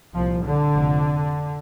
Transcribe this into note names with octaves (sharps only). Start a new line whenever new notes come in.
C2 A#2 F3
D3
F1 F2 C3